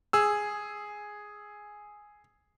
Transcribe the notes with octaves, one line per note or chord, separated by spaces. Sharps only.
G#4 E6